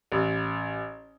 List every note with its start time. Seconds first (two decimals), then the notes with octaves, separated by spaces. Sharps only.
0.12 A1